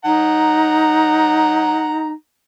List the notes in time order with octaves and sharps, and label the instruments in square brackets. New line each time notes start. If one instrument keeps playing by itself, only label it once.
[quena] D#4 [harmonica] F#5 A#5